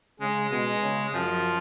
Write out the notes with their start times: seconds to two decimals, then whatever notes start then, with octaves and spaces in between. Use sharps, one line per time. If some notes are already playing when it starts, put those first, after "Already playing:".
0.20 C#3 G#3
0.51 B2 G#3
0.82 C#3
1.13 F#2 F3